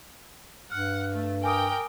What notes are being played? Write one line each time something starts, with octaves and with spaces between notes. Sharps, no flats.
G2 F#5 F6
A3
A#4 G5 G#5 D6 D#6